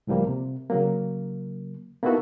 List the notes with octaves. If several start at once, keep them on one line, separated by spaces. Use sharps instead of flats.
C#2 A2 F3 G3 A#3
C3
C#3 F#3 A#3
A#3 B3 D#4 E4 F#4 A4